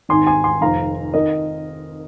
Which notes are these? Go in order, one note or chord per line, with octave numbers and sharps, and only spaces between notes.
G#1 G#2 D#3 G#5 C6
G#5 C6
G#5 C6
F1 F2 D#3 F5 A#5
D#3 A#4 D#5